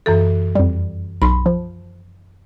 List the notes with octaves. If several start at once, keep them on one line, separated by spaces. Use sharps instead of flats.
F#2 E3 A4
F2 G3
B1 B5 C6
F3